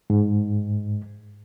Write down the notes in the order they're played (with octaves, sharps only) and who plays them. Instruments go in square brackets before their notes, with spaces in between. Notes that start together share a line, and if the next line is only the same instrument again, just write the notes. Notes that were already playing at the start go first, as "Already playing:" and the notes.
[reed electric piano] G#2